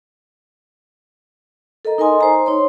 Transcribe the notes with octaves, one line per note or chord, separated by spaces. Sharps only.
A4 A#4 D#5 A#5
D#4 A#4 D#5 G#5 C6 D#6
C5 A#5
D#4 C#5 C6